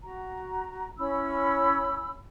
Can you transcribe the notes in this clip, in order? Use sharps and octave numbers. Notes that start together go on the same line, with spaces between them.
F#4 A#5
C#4 E4 B5 E6